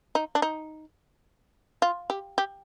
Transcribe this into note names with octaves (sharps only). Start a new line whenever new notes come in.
D#4
D4
D#4
F4
G4
G4